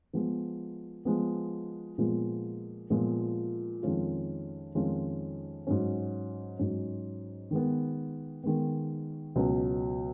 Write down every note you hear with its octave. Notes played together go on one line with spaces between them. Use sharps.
F3 G#3 B3
F3 G#3 B3
A#2 F3 G#3 B3
A#2 F3 G#3 B3
F2 D#3 G#3 C#4 F4
F2 D#3 G#3 C#4 F4
G#2 F#3 C#4
G#2 F#3 C#4
D#3 G#3 B3
D#3 G#3 B3
C#2 B2 F#3 C#4